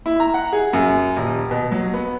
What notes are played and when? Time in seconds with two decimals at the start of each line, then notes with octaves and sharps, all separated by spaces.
0.06 E4
0.20 A#5
0.34 F#5
0.52 G#4
0.73 F#2
1.16 D#1
1.51 B2
1.72 F#3
1.94 B3